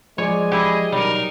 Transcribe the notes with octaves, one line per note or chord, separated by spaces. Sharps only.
F3 G#3 C#5 D5 G#5 D6
E4 G4 G#4 D#5
B2 F#3 G3 D#4 A#4